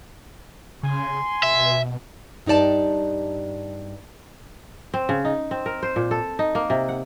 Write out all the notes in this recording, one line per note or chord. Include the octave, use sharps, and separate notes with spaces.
C#3 G#5 C6
B2 E5
G2 D#4 G4 D5 A5
C4
C#3
D#4
C4
A#4
C5
A#2
A4
D#4
A#3
C3
F#5